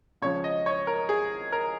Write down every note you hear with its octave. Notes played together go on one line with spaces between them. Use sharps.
C#2 C#3 F3 C#5
D#5
C#5
A#4
G#4
A#4